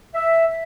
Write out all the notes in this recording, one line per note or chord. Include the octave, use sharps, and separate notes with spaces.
E5
E5